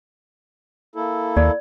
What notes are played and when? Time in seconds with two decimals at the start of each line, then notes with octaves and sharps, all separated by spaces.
0.96 A#3 E4 A4
1.37 D#2 D5